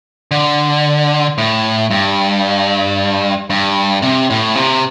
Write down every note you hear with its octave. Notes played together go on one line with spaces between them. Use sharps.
D3
A2
G2
G2
C3
A2
C3